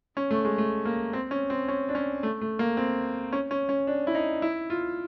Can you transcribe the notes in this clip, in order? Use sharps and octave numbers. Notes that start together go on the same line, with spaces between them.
C#4
A3
G#3
A3
A#3
C4
C#4
C4
C#4
D4
C#4
A3
A3
A#3
C4
C#4
C#4
C#4
D4
E4
D#4
E4
F4